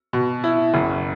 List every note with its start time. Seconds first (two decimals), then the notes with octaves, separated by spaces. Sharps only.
0.13 B2
0.44 E4
0.74 F#1